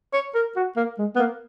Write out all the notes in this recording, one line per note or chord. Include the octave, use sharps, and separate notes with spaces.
C#5
A#4
F#4
A#3
G#3
B3
A#3